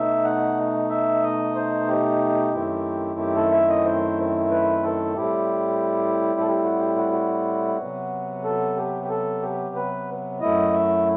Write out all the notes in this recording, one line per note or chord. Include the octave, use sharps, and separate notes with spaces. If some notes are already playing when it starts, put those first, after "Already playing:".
Already playing: B2 A3 D#4 E5
F#5
E5
D#5
C5
G4
F#2 D#3 A3 C4 E4
G4
A4
E5
D#5
C5
B4
A4
A2 G3 C4 E4 G4
A4
G4
F#4
G4
F#4
F#4
C3 F#3 B3
A4
G4
G4
A4
G4
B4
F#2 F#3 A3 E4 D#5
E5